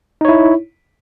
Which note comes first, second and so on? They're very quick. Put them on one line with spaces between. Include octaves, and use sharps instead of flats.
D#4 C#5 E4